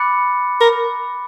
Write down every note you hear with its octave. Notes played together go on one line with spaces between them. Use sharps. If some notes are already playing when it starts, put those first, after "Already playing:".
Already playing: B5 D6 F#6 A6 C#7
A#4